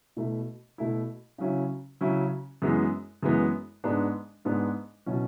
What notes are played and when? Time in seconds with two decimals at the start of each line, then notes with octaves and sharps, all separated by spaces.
0.17 B2 A3 E4
0.78 B2 A3 E4
1.38 C#3 F#3 C#4 E4
2.01 C#3 F#3 C#4 E4
2.62 F#2 E3 G#3 B3
3.23 F#2 E3 G#3 B3
3.84 G#2 G#3 B3 D4
4.45 G#2 G#3 B3 D4
5.06 B2 F#3 C#4 E4